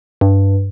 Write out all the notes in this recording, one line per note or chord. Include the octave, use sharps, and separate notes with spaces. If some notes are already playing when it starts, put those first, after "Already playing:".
G2